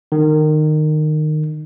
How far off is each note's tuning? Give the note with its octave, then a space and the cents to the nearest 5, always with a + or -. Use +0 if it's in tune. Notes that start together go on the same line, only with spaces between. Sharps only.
D#3 -20